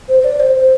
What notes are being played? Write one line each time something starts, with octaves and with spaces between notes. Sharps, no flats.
C5
C5
D5
C5
C5